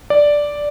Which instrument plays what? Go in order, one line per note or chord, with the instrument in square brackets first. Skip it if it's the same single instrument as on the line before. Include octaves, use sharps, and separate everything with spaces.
[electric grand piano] D5